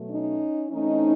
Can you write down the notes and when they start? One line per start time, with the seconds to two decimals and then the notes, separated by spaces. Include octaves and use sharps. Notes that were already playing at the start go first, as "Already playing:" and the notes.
Already playing: B2 F#3 A3
0.09 C#4 D#4
0.70 E3 A3 C4 C#4 D#4